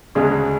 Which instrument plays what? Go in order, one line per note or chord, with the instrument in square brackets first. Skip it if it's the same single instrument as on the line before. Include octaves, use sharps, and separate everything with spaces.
[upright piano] D2 C#3 G#3 D4 [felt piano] G#4